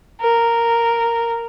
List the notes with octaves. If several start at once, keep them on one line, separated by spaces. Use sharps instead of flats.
A#4